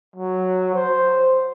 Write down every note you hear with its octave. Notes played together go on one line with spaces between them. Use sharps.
F#3
C5